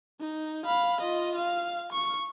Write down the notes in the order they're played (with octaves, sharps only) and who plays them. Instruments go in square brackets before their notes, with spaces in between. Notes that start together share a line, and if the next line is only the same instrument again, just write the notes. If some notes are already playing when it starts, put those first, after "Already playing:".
[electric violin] D#4
F5 B5
F4 D#5
F5
C#6